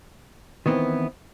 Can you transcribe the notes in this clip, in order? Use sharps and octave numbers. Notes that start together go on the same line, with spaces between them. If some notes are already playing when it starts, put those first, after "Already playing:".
D#3 E3 B3 C4 E4